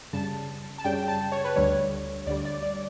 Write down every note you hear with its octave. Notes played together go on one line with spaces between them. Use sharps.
F#2 C#3 G3 A5
A5
F#2 C#3 G3 G5
A5
C#5
B4
D2 D3 G3 C#5
D2 D3 G3 D5
D5
D5